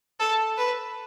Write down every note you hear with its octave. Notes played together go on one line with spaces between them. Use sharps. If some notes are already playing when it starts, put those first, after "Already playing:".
A4
B4